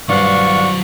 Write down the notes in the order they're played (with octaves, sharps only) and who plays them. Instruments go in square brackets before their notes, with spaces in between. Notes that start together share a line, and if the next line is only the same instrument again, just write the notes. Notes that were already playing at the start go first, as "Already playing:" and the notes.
[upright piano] G2 [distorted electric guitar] F#3 C5 [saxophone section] D5 F5 F#5 [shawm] C#6